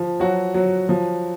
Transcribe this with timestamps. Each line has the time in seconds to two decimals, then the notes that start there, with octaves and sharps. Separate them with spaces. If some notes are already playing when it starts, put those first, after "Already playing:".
Already playing: F3
0.20 F#3 F#4
0.54 F#3
0.89 F3